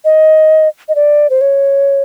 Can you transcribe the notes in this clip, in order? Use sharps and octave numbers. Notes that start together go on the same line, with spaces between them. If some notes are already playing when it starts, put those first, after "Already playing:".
D#5
D#5
D5
C5
C#5